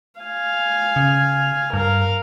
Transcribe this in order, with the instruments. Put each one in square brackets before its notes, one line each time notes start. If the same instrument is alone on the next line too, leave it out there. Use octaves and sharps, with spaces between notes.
[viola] F5 G#5
[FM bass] C#3
[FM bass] G2 [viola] A#4 F5